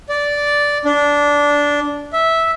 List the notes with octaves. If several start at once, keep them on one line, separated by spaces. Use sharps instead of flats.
D5
D4
E5